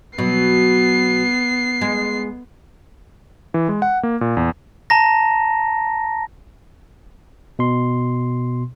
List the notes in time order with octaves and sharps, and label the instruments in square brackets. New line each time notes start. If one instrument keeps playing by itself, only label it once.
[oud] B2 F#3 [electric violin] B3 C7
[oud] G#3
[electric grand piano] E3
G#3
F#5
A#3
A#2
E2
[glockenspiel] A5 A#5 A#6
[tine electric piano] B2 C6